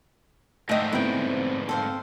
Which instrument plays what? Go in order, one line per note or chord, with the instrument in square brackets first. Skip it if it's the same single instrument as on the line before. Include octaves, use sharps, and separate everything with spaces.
[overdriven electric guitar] G#2 D3 [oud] A3 D#5 [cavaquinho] E5 G5
[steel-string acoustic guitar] B3 C4 [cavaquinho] E4 G5
[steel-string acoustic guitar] C4 [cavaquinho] A4 C5 F5